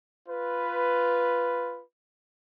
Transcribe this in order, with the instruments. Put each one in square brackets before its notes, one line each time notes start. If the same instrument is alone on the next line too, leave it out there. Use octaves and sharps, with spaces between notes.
[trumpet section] F4 B4